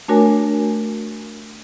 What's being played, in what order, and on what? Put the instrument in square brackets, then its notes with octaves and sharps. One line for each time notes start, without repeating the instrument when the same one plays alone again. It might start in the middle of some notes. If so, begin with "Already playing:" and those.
[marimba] A3 D4 F#4 A#4 C#5 G#5